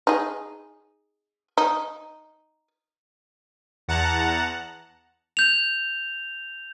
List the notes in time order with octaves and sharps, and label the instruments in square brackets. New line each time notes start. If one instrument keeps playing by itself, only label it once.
[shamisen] D#4 G#4
D#4
[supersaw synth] E2 F#5 A5 A#5
[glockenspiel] G6 F7